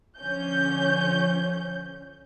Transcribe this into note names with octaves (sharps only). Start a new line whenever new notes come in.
D3 F3 C#4 G6